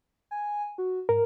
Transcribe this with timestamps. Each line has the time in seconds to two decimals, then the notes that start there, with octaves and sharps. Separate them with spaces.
0.31 G#5
0.78 F#4
1.09 G#2 A#4